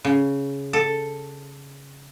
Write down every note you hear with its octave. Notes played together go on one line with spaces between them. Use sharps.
C#3
A4